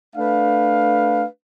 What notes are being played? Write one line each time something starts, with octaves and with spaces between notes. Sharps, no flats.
A3 D4 B4 F5